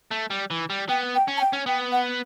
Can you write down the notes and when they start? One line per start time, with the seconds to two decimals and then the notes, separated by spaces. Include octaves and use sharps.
0.11 A3
0.30 G3
0.50 E3
0.70 G3
0.89 B3 G5
1.15 G5
1.28 C#4
1.37 A5
1.41 G5
1.53 C#4
1.66 B3 G5
1.92 F#5